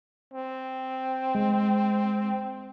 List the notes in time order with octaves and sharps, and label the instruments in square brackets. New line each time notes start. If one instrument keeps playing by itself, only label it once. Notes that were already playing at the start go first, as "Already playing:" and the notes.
[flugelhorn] C4
[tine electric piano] G#3